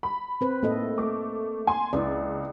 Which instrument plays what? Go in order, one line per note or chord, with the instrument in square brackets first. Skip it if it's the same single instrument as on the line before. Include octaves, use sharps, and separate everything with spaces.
[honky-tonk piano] B5
[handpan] C4 B4 C5
[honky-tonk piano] A2 [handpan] A#3 A4 D#5
[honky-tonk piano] A3 D6
G#5 C6
[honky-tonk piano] C#2 [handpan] E4 B4 D5